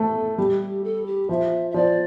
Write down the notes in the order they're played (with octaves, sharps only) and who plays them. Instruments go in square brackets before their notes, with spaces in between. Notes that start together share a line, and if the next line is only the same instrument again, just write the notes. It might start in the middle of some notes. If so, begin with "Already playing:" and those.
Already playing: [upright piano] A3 [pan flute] A4
[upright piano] G3 [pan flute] G4
[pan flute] A4
G4
[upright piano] F3 [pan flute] E5
[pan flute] E5
[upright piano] F3 [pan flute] D5